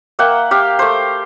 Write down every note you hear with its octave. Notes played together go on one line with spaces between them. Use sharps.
A#3 E5 F#5 G5
G4 F5 G5
A3 C5